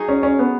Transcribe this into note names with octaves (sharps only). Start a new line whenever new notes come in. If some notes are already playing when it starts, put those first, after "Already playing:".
Already playing: F#3 D#4 G#4
C#4
C#4
B3